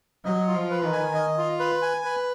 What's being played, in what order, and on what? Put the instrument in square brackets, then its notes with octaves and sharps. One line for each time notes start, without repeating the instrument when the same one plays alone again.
[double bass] F#3 [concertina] D#5
[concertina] F4
[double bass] F3
[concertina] B4
[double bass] D#3
[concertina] G#5
D#5
F4
B4
G#5
B4